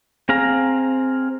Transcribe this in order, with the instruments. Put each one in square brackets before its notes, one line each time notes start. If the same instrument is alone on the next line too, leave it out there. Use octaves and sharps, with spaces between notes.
[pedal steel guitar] C4 G#4 F5 A#5